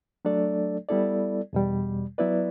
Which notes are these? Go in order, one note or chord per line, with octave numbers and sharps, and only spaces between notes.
F#3 A3 D4 A4 D5
G3 B3 E4 A4 D5
E2 B2 G3
F#3 B3 E4 B4 D5